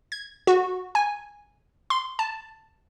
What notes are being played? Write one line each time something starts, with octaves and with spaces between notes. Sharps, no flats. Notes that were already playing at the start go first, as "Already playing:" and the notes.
G#6
F#4
G#5
C6
A5